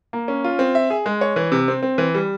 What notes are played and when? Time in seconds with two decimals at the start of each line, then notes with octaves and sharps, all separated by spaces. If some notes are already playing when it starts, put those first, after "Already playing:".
0.13 A#3
0.28 C#4
0.44 F4
0.59 C4
0.75 E5
0.90 G#4
1.06 G#3
1.21 C#5
1.36 E3
1.52 C3
1.68 C4
1.83 C4
1.98 E3
2.14 G3